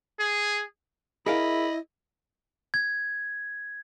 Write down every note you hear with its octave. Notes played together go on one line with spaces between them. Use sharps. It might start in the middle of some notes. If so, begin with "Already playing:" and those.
G#4
E4 G#4 A#4 D#5 F5 B5
G#6